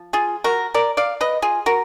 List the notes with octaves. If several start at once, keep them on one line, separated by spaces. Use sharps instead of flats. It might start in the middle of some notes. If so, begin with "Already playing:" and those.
Already playing: F3
F4 G#4
F#4 A#4
A#4 D5
D5 F5
B4 D#5
F4 G#4
F#4 A#4